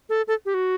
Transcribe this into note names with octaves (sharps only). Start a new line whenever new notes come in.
A4
A4
G4
F#4